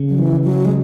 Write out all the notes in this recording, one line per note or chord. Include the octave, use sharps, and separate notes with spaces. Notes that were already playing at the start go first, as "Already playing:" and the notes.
Already playing: C#3
F#3
E3
F#3
G#3